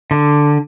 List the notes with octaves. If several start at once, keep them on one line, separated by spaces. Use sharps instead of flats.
D3